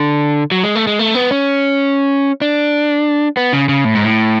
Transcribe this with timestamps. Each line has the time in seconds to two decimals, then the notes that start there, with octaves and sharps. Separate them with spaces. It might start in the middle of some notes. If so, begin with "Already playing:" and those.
Already playing: D3
0.51 F#3
0.63 G#3
0.75 A3
0.87 G#3
0.99 A3
1.15 B3
1.31 C#4
2.42 D4
3.37 B3
3.53 C#3
3.69 C#3
3.85 A2
3.95 G#2
4.04 A2